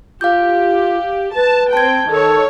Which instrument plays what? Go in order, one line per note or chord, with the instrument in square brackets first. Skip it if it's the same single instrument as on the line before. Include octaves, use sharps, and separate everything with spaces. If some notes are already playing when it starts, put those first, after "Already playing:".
[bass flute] F4 [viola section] G4 [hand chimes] F5 D6 G6
[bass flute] B4 [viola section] A5
[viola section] C4 G5 [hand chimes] A5 G#6
[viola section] D#3 C#5 [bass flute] A4